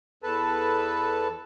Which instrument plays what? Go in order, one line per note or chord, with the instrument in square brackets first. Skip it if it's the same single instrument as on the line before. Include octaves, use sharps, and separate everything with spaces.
[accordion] E2 A4 B4 A5